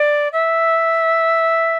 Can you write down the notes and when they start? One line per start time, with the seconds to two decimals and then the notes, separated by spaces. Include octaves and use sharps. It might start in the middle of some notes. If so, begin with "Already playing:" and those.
Already playing: D5
0.33 E5